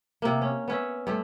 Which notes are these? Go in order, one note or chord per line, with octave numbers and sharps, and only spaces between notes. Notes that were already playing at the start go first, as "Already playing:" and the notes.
C3 A#3
C#4
B3 C#4 E5
G2 A3